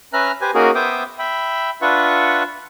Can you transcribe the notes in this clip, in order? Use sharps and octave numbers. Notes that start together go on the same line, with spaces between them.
C#4 B4 E5 A#5 F6 F#6
G4 B4 C5 G#5
A#3 C#4 D#4 F#4 G#4 A#4
B3 C5 E5 G5 D6 D#6
E5 G5 B5
D4 F4 B4 E5 F#5 C#6